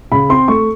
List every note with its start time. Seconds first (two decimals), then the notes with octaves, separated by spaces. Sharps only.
0.12 C#3 B5
0.29 C4 C6
0.48 A3 C#6